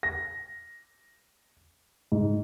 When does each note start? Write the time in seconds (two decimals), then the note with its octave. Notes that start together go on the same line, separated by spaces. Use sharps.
0.03 A#6
2.12 G#2